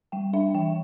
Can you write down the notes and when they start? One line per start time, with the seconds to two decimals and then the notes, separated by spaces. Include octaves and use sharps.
0.12 G3 G5
0.33 D4 E5
0.55 E3 G5